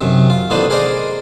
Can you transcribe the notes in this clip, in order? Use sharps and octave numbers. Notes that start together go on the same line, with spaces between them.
F#2 C3 D#3
F4
A1 D#3 B3 D4 C5 D#5
G#4 A#4 C5 D5 D#5 A#5